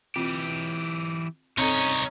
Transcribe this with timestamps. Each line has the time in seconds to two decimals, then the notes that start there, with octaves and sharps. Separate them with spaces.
0.16 E3 C4 F4 G4
1.58 C2 C4 C#4 D#4 A4 C#5